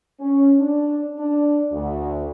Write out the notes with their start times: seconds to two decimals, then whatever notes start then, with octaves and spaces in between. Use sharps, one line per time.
0.20 C#4
0.58 D4
1.19 D4
1.72 D2